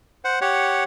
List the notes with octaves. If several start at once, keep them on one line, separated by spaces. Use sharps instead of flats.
C5 F#5
G4 C#5 F#5